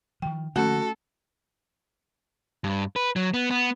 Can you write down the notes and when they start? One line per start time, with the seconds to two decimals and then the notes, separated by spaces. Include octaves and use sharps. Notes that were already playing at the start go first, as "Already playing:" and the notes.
0.22 D#3 F3 G5
0.56 D3 F3 A3 A#3 C#4 F#4 A4
2.64 G2
2.96 B4
3.16 F#3
3.34 B3
3.51 B3